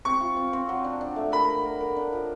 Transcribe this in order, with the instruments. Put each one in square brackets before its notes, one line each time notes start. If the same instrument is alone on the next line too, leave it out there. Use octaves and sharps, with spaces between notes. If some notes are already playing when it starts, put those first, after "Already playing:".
[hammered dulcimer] C4 [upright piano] C#6
[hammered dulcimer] F4
C4
C4
F#3
D4
D4
A3
[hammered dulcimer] A#4 [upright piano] B5
[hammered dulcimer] A#4
A#4
A#4
D4
F3